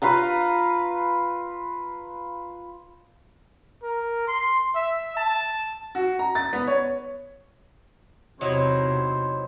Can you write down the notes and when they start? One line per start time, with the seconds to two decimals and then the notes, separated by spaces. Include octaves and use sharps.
0.02 F4 B4 F5 A#5
3.82 A#4
4.27 C6
4.75 E5
5.17 A5
5.95 F#4
6.19 A#5
6.35 A6
6.53 B3
6.68 C#5
8.41 E2 C3 F#3 D#4 E4 C5